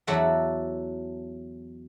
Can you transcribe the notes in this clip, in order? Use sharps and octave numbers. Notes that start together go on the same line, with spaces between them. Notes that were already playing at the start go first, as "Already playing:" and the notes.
E2 F#3 F#4 A4 D5 E5